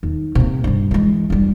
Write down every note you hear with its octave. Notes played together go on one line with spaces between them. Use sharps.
D#2
C3 A#3
G2 C3
E3 G#3
F1 G3